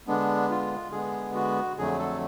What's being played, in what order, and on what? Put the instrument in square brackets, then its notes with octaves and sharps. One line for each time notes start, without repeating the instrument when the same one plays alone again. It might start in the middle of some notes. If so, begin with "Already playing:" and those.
[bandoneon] D3 G#3 B3 D4
F4
D3 G#3 B3 G#4
F#4
F2 D3 F#3 A3 G#4
A4